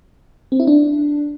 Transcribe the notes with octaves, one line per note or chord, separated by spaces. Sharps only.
C4
E4
D4